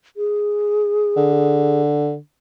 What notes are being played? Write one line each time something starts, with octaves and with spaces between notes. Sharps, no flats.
G#4
D3